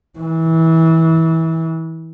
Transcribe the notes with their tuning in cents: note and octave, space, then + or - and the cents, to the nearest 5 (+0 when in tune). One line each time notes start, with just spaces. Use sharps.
E3 -25